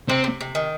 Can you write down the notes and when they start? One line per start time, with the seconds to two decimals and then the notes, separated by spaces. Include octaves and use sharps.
0.09 C3 C4
0.24 C3
0.41 C3
0.55 D#3